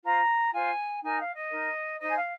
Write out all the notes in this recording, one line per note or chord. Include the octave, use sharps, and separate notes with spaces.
F4 C5 A#5
F4 C5 G#5
D#4 A#4 G#5
F5
D#5
D#4 A#4
D#4 C5 D#5
G#5
F5